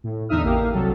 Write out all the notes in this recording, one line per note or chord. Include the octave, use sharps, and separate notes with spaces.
A2
E2 D3 D#4 E5 D#6 F6
A1 A#3 G4 F5
C2 F#3 A4